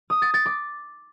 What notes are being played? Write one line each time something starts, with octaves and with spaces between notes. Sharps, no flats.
D#6
A6
A6
D6